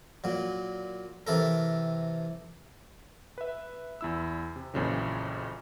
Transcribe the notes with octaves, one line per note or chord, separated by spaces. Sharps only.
A#2 F#3
C3 E3 A4 A#4
B4 E5
E2 E4 E6
C3
A#1 F2 A#2 C#3 E3 F#3